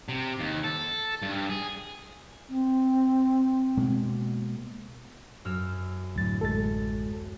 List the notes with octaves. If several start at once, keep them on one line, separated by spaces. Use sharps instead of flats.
C3
D#2
A4
G2
G#4
C4
B2 G#3 A#3
F#2 E6 F6
D2 A2 F#3 A6
A1 G#3 A4 A6